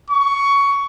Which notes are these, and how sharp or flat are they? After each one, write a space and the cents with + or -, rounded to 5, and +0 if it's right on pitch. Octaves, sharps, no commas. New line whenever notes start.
C#6 +15